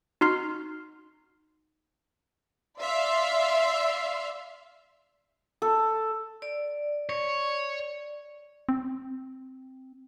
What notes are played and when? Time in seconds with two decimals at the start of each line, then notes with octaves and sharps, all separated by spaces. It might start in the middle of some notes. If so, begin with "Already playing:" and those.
0.21 D#4 F#4 C6 F6 C7
2.81 D5 E5 F5 C6
5.62 A4
6.42 D5
7.09 C#5
8.69 C4